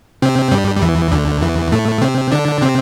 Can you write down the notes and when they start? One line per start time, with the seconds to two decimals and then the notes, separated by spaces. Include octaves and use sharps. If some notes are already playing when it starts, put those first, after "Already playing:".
0.22 C3 C4
0.51 G2 G3
0.76 G3
0.82 E2 E3
1.12 D2 D3
1.42 E2 E3
1.72 A2 A3
2.02 C3 C4
2.32 D3 D4
2.62 C3 C4